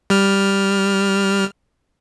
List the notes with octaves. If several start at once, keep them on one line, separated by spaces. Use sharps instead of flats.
G3 F6